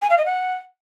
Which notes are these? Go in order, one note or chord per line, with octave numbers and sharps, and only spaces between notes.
G#5
F5
D#5
F#5